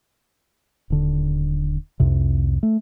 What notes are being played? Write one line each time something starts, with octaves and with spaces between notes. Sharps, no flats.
D#1 D3
C2 F2 C3
A3